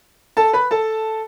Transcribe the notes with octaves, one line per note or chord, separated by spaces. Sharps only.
A4 A5
B4 B5
A4 A5